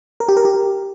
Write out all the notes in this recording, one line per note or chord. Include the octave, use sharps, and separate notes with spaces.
A#4
G4
A#4
G4